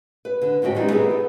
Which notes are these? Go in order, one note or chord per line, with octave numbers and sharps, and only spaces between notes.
B4
D3
E2 G#2 C#4 F#4 G5
E3 G3 G#3 D#4 E4
B3 C4 E4 G#4 B4
A4